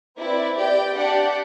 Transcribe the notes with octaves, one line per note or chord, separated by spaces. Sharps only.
C4 E4 B4 D5
G4 D5 G5
D4 G4 D5 F#5